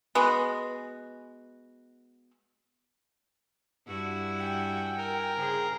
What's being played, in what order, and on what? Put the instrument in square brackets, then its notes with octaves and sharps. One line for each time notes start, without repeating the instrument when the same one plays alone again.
[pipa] G#3 B3 F#4
[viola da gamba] G2 E4 F#4
[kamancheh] G5 G#5
[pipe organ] A#4
[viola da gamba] C#3 G#4 C5